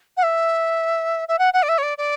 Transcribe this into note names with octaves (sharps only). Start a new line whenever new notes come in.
F#5
E5
E5
F#5
F#5
D5
E5
C#5
D5
D5